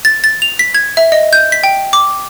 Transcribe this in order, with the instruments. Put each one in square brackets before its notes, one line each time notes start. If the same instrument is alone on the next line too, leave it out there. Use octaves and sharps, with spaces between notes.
[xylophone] A6
A6
F7
B6
G#6
E5
D#5
G6
B6
G5
D6